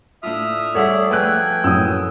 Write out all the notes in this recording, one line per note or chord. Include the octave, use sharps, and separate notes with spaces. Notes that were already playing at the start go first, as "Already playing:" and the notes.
A2 D4 F4 E5 D#6 F6
G2 G#4 A4 C#5 D5 E5 F#5 E6
F3 A3 C#4 B4 G5 G#5 F#6
F#2 A2 D#6 E6